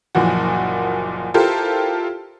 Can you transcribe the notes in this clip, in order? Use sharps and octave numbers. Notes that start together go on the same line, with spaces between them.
F#1 A#2 E3 F3 F#4
E4 F4 G4 A4 A#4 C5